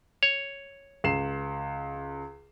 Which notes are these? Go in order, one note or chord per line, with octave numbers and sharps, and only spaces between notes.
C#5
C#2 C7 E7